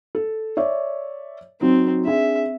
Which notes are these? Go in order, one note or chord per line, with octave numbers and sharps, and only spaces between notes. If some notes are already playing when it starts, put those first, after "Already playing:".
A4
C#5 D5 E5
F#3 C4 D#4
D4 G#4 E5